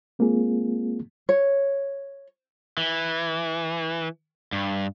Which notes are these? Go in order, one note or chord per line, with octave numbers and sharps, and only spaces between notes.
G#3 A#3 C4 F4 G#4
C#5
E3
G2